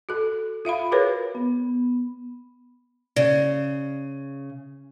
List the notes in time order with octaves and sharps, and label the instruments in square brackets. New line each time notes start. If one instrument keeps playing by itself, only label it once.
[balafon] F#4 A4
F4 E5 F5 B5
F#4 G#4 A#4 B4 C#5
[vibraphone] B3
[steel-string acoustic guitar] C#3 [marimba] D5